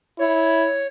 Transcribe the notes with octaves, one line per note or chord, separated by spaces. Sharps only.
E4 C#5